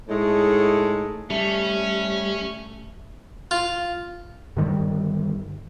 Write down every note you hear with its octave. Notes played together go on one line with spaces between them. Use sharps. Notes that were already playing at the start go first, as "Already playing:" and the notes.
A2 G#3 A3 D#4 G#4
G3 A3 C#4
F4
G2 D3 D#3 G3